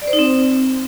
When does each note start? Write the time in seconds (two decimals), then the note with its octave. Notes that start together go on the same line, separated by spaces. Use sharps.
0.02 D5
0.07 C5
0.13 D#4
0.19 C4